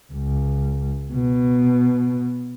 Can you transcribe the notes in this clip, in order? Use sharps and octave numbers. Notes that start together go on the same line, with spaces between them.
C#2
B2